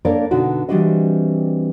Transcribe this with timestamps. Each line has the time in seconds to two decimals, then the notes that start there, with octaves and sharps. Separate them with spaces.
0.05 A#3 D4 A4 A#4 C#5 D5
0.31 B2 D3 D#4 F#4
0.69 E3 G3 C4 D4 F#4 D#5